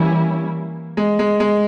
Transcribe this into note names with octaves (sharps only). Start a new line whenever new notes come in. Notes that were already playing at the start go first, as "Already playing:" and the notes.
Already playing: E3 G3 A#3 C#4 E4
G#3
G#3
G#3